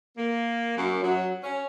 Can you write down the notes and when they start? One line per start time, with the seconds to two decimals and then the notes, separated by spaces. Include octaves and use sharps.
0.18 A#3
0.77 F#2
1.03 F#3
1.43 C#4